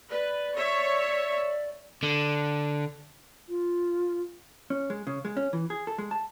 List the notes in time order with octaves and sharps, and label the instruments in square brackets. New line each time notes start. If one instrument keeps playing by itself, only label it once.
[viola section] B4 [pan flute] D5
[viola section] C#5 E5
[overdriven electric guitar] D3
[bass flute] F4
[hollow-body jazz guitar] C#4
G#3
C#3
G#3
C#4
E3
G#4
A4
G#3
A5